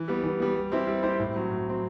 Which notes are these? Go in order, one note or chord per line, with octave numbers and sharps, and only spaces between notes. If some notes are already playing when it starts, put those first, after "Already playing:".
Already playing: E3
G3 B3
E3
G3 B3
G3
C4 E4 G4 C5
G3
C4 E4 G4 C5
A2
F#3 C4
A2
F#3 C4